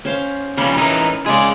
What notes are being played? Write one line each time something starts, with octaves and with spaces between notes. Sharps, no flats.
C#4 C5 F5
C#3 F3 G3 C#4
A2 E3 D#4 A#4
C#3 G#3 G#4 D5